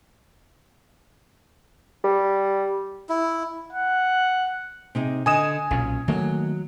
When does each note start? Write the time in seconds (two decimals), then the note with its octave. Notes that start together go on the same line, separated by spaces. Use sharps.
2.04 G3
3.09 E4
3.72 F#5
4.95 C3 D#4 G#4
5.26 D3 D#5 G#5 D#6 E7
5.71 B1 A#2 C#4
6.08 D#3 F#3 A3 A#3